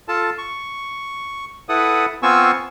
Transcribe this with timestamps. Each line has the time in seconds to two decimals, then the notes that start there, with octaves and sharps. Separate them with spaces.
0.08 F4 A4 A5
0.38 C#6
1.69 E4 A4 B4 F#5 D#6
2.23 B3 C4 F4 G#5 C#6 E6